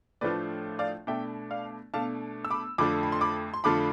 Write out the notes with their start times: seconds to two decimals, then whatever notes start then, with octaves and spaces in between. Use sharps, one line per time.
0.21 A2 F3 A3 D4 F4 B4 D5
0.79 D5 F5
1.07 B2 A3 D4 E5 G5
1.50 D5 F5
1.94 B2 A3 D4 F5 A5
2.45 E6
2.51 B5 D6
2.78 F2 D3 A3 D4 F4 B5 D6
3.03 B5
3.12 C6
3.21 B5 D6
3.54 C6
3.64 F2 D3 A3 D4 F4 B5 D6